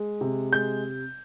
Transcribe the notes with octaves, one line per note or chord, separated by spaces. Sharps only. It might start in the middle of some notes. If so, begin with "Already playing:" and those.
Already playing: G#3
C3
G#3 G6